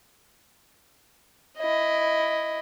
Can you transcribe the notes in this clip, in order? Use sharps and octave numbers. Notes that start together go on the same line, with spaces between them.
E4 D#5